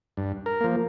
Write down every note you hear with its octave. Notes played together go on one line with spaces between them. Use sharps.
G2
A#4
F3 A#3